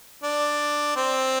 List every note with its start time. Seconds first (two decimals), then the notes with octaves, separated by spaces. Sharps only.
0.23 D4
0.96 C4